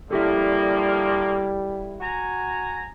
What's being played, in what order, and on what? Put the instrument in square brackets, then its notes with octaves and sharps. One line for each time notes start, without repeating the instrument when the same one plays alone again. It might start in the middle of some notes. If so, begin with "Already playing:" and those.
[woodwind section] D3 F3 A#3 [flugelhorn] G3 [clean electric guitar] E4 G4 A4
[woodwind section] F#4 G#5 A#5